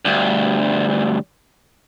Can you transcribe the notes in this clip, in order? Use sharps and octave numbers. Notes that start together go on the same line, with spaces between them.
D2 G2